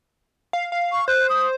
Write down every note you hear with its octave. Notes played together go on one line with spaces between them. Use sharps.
F5
F5
C#6
C5 F#6
D#6